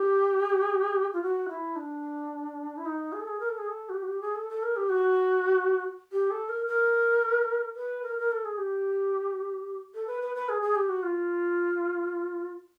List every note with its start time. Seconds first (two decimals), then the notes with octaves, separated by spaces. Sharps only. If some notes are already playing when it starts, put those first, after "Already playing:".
Already playing: G4
1.13 F4
1.22 F#4
1.49 E4
1.76 D4
2.77 E4
2.85 D#4
3.12 G#4
3.20 A4
3.27 G#4
3.40 A#4
3.49 A4
3.58 G#4
3.68 A4
3.89 F#4
3.94 G4
4.02 F#4
4.08 G4
4.21 G#4
4.35 A4
4.49 A4
4.62 A#4
4.76 G4
4.89 F#4
6.12 G4
6.30 A4
6.49 A#4
6.67 A#4
7.75 B4
8.03 A#4
8.18 A#4
8.32 A4
8.45 G#4
8.57 G4
9.94 A4
10.07 B4
10.21 B4
10.35 B4
10.49 G#4
10.62 G#4
10.75 G4
10.89 F#4
11.03 F4